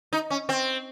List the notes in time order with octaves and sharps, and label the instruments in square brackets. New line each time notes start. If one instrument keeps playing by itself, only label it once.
[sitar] D#4
C#4
C4